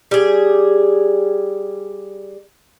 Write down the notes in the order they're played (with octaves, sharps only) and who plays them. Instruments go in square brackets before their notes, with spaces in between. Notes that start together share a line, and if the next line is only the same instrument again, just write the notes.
[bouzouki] G3 G#4